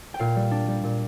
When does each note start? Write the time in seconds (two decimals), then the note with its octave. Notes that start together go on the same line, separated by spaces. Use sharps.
0.14 G5
0.19 A#2 F5
0.36 G3
0.51 D4
0.68 G3
0.84 A#2